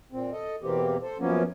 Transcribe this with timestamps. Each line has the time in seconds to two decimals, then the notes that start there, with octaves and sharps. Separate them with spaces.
0.12 A#2 C4
0.32 A4 D#5
0.62 E2 B2 E3 A#3 C4 G4
1.02 A4 C5
1.19 F#2 F3 A#3 B3 C#4